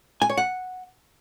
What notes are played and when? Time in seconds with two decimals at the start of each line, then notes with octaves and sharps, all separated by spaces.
0.22 G#5
0.29 C#5
0.37 F#5